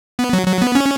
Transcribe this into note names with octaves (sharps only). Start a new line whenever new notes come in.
B3
F#3
F#3
B3
C#4